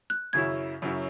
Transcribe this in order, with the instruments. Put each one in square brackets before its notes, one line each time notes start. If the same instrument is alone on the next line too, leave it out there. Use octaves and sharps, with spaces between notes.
[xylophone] F#6
[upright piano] F#2 C#3 F#3 C#4 E4 [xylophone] G#6
[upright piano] F#2 C#3 F#3 C#4 E4